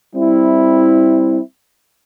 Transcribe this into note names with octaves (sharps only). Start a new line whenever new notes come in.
G3 C4 E4